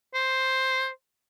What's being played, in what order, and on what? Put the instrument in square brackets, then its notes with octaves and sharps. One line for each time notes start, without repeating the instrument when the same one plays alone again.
[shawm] C5